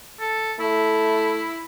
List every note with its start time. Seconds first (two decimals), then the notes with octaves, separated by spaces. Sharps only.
0.20 A4
0.59 A3 E4